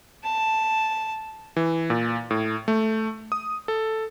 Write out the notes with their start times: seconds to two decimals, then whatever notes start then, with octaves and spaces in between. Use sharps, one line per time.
0.24 A5
1.56 E3
1.90 A#2
2.31 A2
2.68 A3
3.32 D#6
3.68 A4